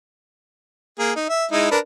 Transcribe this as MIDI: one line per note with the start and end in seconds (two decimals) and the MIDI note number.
0.99 1.12 58
0.99 1.12 68
1.16 1.29 63
1.29 1.46 76
1.52 1.70 56
1.52 1.70 63
1.52 1.70 64
1.71 1.78 62
1.71 1.78 70
1.71 1.78 71